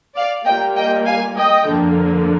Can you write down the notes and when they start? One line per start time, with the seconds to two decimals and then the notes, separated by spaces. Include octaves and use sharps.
0.16 D5 F5
0.46 A#2 G3 A#3 D#5 G5
0.76 D#5 G5
1.06 F5 G#5
1.36 D#5 G5
1.66 F2 D3 F3 A#3